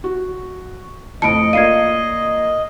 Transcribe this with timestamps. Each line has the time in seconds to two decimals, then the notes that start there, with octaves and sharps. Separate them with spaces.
0.04 F#4
1.22 F2 A2 F3 D#5 A5 B5 C#7 D7
1.53 A#3 F4 D5 F5 G#6 C7 D#7